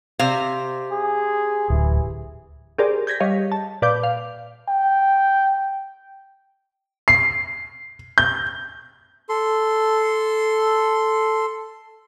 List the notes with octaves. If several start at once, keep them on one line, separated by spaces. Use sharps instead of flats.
C3 C5 F5
G#4
D1 E3
G4 G#4 A#4 C5 D5
G6 G#6 A#6 B6
G3 G4 C#5 D#5 F5
A5
A#2 B4 D5 F5 D6 G6
F5
G5
C7
G6
A4 C6